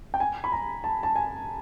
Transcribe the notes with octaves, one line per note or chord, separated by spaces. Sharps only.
G5
G#5
B5
A#5
A5
A5
G#5